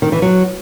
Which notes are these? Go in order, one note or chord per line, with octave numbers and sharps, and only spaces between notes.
D#3
E3
F#3